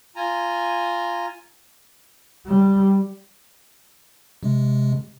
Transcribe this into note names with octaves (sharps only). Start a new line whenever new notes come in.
F4 G#5 A#5
G3
C3 G#3